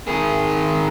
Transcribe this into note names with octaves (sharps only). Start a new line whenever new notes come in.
D#3 G#4